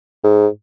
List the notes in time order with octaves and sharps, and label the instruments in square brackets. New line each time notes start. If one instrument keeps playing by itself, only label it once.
[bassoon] G#2